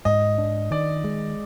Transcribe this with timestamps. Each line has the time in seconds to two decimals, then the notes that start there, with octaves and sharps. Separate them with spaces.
0.05 G#2 D#5
0.38 D4
0.71 D#3 D5
1.04 G#3